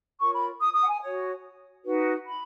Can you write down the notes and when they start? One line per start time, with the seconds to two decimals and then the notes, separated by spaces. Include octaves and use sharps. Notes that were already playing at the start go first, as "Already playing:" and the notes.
0.19 F4 A#4 C#5 C#6
0.33 B5
0.60 D#6
0.74 D#6
0.81 F#5
0.88 G#5
1.01 F#4 C#5
1.83 D#4 F#4 B4
2.24 B5